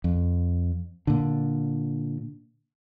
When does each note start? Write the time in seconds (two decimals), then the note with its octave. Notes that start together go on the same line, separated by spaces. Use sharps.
0.04 F2
1.07 A#2 D3